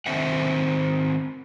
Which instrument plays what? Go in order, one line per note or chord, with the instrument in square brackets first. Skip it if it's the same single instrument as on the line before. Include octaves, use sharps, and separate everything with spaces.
[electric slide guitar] D#3 E3 C4 C5 E5 F#5